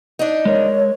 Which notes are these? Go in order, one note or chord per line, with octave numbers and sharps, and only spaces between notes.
D4 D#4
G#3 A#4 C#5